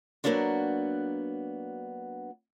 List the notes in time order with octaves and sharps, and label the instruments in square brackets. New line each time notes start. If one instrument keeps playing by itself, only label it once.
[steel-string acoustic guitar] F#3 G#3 A#3 B3 D4 F#4